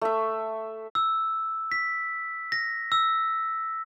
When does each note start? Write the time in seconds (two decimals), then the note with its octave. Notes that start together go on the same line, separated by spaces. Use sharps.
0.01 A3 E5
0.95 E6
1.72 B6
2.52 A#6
2.92 E6